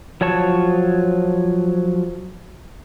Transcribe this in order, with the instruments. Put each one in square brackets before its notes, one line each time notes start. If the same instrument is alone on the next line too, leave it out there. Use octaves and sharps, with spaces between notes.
[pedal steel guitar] F3 F#3 C#5 A5 C#6